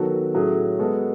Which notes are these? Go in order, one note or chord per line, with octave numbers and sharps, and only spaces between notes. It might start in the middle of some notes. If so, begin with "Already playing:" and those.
Already playing: D#3 F#3 B3 F#4 A4
A2 F#3 C#4 G#4
G#3 B3 F#4 A4